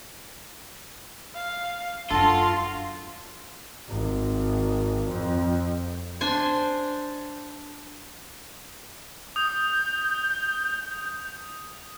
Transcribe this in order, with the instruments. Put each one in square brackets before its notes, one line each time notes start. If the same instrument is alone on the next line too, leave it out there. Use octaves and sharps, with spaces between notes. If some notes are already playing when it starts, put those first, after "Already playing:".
[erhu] F5
[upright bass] F#2 D4 [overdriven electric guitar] F4 [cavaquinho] F#4 A4 [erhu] C6
[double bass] G#1
F2
[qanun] D4 C5 G#5 C6
[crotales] D#6 [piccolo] G6